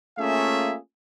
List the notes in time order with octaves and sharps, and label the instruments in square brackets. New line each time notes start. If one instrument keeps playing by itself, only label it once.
[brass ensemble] A3 A#3 C#4 F4 G#4 E5